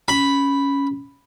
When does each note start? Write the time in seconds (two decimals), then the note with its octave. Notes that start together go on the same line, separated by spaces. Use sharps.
0.08 C#4 B5